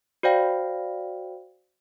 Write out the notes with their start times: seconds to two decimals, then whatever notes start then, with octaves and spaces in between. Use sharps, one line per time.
0.23 F#4 C5 D5 F5 G5